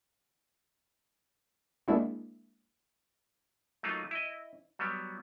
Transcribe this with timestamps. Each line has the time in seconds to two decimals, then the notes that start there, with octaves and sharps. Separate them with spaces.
1.88 G#3 A#3 D4 E4 F#4
3.83 F#3 A3 A#3 D#4 F4
4.11 E4 D#5
4.79 F#3 G3 B3